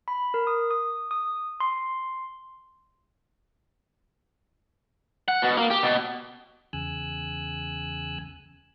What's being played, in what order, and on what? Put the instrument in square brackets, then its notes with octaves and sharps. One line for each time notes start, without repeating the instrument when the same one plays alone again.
[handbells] B5
A#4
D#6
D#6
D#6
C6
[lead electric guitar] F#5
B2
A#3
G4
B2
[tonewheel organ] E2 C#3 G#5 E6 F#6